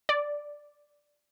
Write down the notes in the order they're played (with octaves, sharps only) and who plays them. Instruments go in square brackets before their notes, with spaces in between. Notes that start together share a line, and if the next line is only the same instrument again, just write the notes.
[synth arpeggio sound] D5